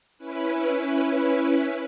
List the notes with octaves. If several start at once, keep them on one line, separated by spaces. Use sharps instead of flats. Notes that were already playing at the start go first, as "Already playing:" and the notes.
C#4 E4 B4